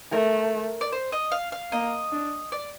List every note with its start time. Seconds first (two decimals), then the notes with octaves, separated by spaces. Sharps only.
0.12 A3 A#4
0.81 D5
0.92 C5
1.12 D#5
1.31 F5
1.52 F5
1.72 A#3 D#5
2.12 D4
2.52 D5